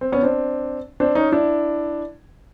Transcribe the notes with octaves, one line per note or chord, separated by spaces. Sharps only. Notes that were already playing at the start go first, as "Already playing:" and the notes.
C4
B3 C#4
C4 D4
C4 D4
C#4 D#4
D4 E4